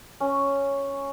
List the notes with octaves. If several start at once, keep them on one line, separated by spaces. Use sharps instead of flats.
C#4